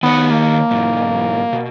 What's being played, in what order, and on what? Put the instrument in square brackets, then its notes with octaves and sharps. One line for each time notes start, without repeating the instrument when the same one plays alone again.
[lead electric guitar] D#3 C#5 [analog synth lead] B3
[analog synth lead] A#3
[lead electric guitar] B1 G#2
B2